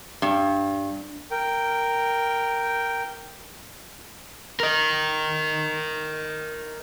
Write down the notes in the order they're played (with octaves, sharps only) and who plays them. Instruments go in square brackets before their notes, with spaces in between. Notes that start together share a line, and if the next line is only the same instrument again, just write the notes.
[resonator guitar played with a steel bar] G2
[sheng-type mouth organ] A#4 G5
[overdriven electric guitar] A#4 D#5